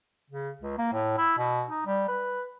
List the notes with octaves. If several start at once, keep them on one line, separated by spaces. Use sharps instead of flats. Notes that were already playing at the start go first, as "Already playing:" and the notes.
C#3
C#2
A#3
A2
E4
B2
D#4
G3
B4